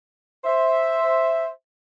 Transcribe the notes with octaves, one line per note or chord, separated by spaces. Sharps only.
C5 E5